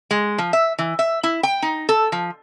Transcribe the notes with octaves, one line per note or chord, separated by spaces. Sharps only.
G#3
F3
E5
E3
E5
E4
G5
D#4
A4
F3